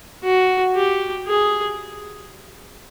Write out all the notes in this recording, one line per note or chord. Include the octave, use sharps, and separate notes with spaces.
F#4
G4
G#4